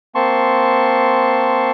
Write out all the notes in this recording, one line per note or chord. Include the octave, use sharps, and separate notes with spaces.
A#3 C4 A5 C6 C#6